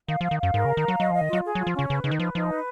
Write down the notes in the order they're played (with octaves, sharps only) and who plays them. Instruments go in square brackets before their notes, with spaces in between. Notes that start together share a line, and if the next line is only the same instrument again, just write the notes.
[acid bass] D#3 [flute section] F5
[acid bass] F3 [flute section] F5
[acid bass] D#3
[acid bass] F#2 [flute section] F5
[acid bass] G#2 [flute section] A#4
[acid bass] C#3
[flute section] A#5
[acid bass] D#3
[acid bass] F#3 [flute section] F5
[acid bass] F#3 [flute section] D#5
[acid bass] F3
[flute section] D#5
[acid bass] D#3
[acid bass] F#3 [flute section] F4
[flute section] G#4
[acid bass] F#3
[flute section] F4
[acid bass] F3
[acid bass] C#3 [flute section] C#4
[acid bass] C#3 [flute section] B4
[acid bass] C#3 [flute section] D#4
[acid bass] D#3
[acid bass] F3 [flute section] B4
[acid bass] F3 [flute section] D#4
[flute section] B4